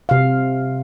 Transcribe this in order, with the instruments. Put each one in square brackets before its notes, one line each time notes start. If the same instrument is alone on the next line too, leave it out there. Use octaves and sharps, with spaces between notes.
[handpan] C3 F5